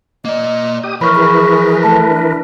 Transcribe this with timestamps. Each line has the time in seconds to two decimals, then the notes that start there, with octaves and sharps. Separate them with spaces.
0.25 A#3 D5 D#5
0.83 G4 D#6
1.01 E3 F3 A#4 B4 C#5 B5 C#6 F6
1.15 G#4
1.83 A3 A5
2.09 D4